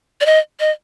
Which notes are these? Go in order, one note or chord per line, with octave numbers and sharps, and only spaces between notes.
D5
D#5
D#5